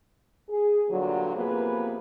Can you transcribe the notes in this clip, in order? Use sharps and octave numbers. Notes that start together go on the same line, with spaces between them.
G#4
G2 A#2 D3 F#3
C3 F3 A#3 B3 G#4 B4